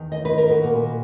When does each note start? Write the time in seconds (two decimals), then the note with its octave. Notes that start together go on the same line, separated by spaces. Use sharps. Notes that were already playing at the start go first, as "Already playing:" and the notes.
Already playing: E2 D#3
0.12 D#5
0.25 B4
0.37 A#4
0.51 F#4
0.63 A#2